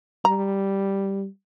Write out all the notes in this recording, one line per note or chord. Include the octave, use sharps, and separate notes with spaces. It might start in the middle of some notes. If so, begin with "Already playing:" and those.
G3 A#5